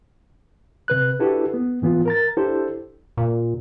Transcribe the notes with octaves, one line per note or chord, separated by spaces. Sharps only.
C3 B4 F#6
D4 E4 F#4 G4 A4 B4
B3
G#2 E3 B3 F4
A#4 A#5 A6
D4 E4 G4 A4 C5
A#2